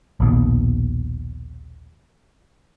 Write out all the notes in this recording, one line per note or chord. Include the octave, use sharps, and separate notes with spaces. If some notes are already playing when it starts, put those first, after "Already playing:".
A#1 D#2 B2